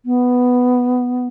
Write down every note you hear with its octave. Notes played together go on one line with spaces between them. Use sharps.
B3